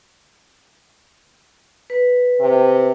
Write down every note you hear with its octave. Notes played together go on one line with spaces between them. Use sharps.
B4
C3